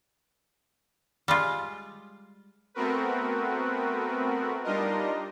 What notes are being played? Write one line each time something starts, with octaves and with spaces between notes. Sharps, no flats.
G3 G#3 F4
A3 B3 C4 F#4 A#4 B4
G3 D4 D#4 F4 A#4 D#5